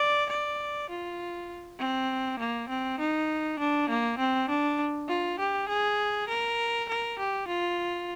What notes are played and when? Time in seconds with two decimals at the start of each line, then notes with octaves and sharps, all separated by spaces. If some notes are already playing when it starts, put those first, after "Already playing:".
Already playing: D5
0.30 D5
0.90 F4
1.79 C4
2.39 A#3
2.69 C4
2.99 D#4
3.59 D4
3.90 A#3
4.19 C4
4.49 D4
5.08 F4
5.39 G4
5.69 G#4
6.29 A#4
6.89 A#4
7.19 G4
7.48 F4